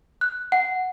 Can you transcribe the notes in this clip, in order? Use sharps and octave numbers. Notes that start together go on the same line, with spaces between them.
F#6
F#5